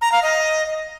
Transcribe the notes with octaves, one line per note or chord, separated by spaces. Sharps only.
A#5
F5
D#5